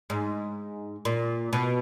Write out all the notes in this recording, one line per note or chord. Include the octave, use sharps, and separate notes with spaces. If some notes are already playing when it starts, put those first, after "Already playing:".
G#2
A#2
B2